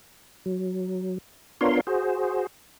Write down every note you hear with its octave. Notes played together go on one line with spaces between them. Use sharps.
F#3
B3 D4 F4 A#4 C#5 C6
F#4 G#4 C5